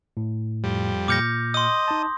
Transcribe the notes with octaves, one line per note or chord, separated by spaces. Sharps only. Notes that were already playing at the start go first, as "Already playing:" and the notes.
A2
F2 G3
A#2 D6 F6 G6 A#6 C#7
D#5 C6 D#6
D#4 A5